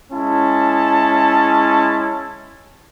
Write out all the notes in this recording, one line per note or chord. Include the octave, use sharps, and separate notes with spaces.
G#3 C#4 E4 A5